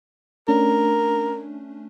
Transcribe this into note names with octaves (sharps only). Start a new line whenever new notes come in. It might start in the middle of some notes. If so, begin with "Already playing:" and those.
A3 C#4 D4 A#4